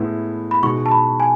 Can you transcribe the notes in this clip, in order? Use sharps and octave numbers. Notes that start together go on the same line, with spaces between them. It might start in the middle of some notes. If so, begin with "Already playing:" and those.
Already playing: A2 G#3 B3 E4
B5
B2 G#3 D#4 F#4 C#6
A5
B5
G#5